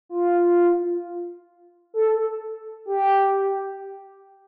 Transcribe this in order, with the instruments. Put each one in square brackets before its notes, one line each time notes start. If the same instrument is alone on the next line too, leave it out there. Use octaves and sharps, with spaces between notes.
[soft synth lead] F4
A4
G4